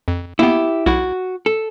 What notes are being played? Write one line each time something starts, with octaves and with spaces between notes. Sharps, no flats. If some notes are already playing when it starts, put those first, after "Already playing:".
F2
A#3 B3 E4 G4
B1 E4 F#4
A4